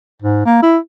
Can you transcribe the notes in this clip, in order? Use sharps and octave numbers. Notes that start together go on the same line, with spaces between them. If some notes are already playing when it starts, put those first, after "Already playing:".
G#2
A#3
E4